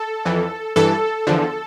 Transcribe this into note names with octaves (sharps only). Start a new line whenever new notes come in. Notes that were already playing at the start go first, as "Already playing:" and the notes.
Already playing: A4
F2 E3
G2 E3 A4
E2 D3 F3